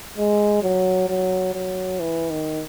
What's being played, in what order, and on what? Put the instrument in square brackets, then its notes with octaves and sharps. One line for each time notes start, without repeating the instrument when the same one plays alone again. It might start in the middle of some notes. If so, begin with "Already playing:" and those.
[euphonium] G#3
F#3
F#3
F#3
E3
D#3